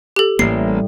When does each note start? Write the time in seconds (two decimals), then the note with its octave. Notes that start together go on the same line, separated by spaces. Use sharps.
0.16 G4 A4
0.39 A1 A2 G3 A#3 C7